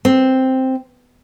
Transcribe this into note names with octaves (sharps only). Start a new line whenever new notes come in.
C4